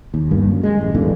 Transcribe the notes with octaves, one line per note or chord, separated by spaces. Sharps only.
D#2
G1 G2 A#3
F#2
G#3
A1
D1 E2 G2 D3